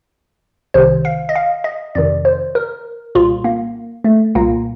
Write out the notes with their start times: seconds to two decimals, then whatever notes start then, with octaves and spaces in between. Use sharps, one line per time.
0.74 C2 C3 D#3 C5
1.05 F5
1.29 D#5
1.36 F5
1.64 D#5
1.95 F2 C3 D#3 D5
2.25 C5
2.55 A#4
3.15 C2 A#2 F4
3.44 A#3
4.04 A3
4.35 C2 A#2 A#3